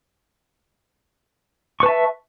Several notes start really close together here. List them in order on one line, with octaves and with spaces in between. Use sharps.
C#6 B4 A5 E5